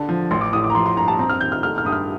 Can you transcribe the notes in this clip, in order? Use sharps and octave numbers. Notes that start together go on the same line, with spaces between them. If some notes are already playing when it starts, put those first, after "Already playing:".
Already playing: D3 D5 A5
F3
A1 C6
D6
A2 D#6
D6
A#5
F3 C6
C6
G2 A#5
A5
C4 A#5
F6
D#3 G6
F6
A3 F6
F6
G2 D#6
F6